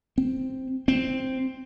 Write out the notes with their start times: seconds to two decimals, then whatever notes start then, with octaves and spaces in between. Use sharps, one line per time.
0.18 C4
0.88 C4